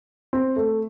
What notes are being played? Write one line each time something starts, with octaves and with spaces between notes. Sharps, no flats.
C4
A3